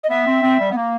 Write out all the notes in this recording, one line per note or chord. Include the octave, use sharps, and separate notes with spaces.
D#5
B3 E5
C4
C4
G3
B3
A#3